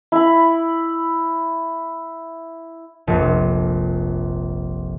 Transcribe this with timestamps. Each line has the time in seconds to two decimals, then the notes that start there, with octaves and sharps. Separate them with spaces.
0.12 E4 B5
3.07 F1 A#1